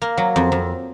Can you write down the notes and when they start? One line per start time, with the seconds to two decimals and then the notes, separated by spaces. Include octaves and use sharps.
0.02 A#3
0.18 F#3
0.36 F2
0.52 F2